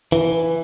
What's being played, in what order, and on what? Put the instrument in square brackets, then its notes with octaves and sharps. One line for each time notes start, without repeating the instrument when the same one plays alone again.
[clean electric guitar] E3